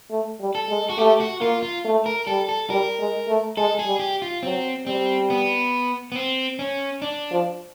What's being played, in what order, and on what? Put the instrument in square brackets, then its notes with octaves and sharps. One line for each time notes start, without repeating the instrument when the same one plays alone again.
[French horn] A3
G3
[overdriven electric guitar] A4
[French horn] G#3
[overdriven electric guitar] F#4
[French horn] A3 [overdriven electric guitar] G4
[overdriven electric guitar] F#4
[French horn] A#3 [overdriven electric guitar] F4
[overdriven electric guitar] F4
[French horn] A3
[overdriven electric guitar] A#4
[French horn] G3 [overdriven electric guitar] A4
[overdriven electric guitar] A4
[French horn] G3 [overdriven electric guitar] A#4
[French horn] G#3
A3
[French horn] G#3 [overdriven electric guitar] A4
[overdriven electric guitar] G#4
[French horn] G3
[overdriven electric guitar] G4
F4
[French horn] F#3 [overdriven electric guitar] C4
[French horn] G3 [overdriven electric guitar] C4
[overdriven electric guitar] B3
B3
C4
C#4
D4
[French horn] F3